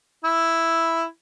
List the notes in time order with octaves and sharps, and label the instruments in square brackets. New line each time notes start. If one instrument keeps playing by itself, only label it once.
[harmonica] E4